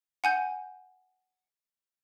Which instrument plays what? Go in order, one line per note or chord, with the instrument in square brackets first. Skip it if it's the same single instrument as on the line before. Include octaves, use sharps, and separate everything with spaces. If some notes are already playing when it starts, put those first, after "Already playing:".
[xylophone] F#5 G#5 G6